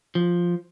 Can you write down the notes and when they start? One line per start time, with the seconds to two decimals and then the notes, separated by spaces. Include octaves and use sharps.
0.15 F3